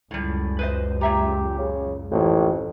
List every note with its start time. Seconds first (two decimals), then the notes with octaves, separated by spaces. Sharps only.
0.11 C#2 F#2 A2 G3
0.59 B4 C5 D#5
1.01 A#2 G4 E5 A#5
1.58 C#3
2.11 A1 F2